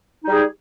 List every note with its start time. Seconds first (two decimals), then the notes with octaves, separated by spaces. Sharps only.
0.25 D#4
0.28 G3
0.31 G#4